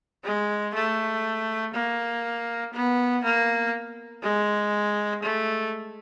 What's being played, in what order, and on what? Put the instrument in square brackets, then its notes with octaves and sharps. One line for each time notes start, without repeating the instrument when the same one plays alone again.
[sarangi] G#3
A3
A#3
B3
A#3
G#3
A3